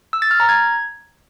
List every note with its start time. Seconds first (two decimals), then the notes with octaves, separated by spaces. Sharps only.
0.13 E6
0.22 A6
0.31 F6
0.40 A#5
0.49 G#6